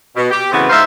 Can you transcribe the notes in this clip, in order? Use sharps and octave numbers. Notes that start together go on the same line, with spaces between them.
B2
G4
A2 C#3 E3 B3 C4 F#4
G#2 D#4 C5 E5 F5